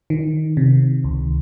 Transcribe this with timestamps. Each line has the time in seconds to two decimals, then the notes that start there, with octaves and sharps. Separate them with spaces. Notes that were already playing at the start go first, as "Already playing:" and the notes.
0.10 D#3
0.57 C3
1.04 C#2